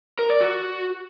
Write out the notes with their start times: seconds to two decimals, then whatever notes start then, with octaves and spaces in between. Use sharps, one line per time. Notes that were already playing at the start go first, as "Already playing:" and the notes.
0.19 A#4
0.30 D5
0.41 F#4